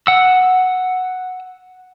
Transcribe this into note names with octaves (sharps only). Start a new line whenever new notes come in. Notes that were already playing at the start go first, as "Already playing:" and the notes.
F#5 E6